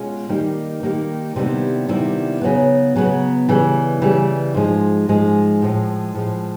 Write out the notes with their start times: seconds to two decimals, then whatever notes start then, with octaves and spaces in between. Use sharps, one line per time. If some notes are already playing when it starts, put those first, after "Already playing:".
Already playing: B2 G#3 C#4 F4
0.29 D#3 G3 A#3 D#4 G4
0.83 D#3 G3 A#3 D#4 G4
1.36 C3 D#3 G3 B3 E4
1.89 C3 D#3 G3 B3 E4
2.41 C#3 F#3 B3
2.96 C#3 F#3 B3
3.49 C#3 E3 G3
4.02 C#3 E3 G3
4.54 G#2 F3 G#3
5.09 G#2 F3 G#3
5.62 A2 F3 G#3
6.15 A2 F3 G#3